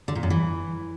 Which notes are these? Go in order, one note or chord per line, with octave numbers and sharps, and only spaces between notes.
D3
A#2
F#2
E3